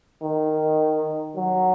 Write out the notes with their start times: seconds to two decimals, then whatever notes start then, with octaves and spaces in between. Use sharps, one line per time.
0.22 D#3
1.36 F#3